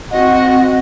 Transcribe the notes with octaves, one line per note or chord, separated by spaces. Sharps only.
C4 F#4 D#5